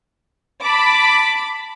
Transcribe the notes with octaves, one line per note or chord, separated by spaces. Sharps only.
A5 B5 D6